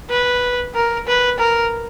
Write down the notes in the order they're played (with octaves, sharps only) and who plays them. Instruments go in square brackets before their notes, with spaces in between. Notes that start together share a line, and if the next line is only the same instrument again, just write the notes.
[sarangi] B4
A#4
B4
A#4